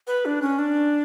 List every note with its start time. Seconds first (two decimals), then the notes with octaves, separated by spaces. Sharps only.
0.07 B4
0.25 D4
0.42 C#4
0.59 D4